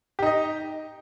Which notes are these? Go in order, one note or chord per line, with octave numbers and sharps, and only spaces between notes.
D#4 G4 D#5